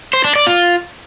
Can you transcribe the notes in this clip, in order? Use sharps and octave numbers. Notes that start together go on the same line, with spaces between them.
C5
D4
D5
F4